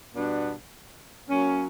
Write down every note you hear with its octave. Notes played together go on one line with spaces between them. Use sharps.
B2 G3 B3 D4
F#3 A#3 C#4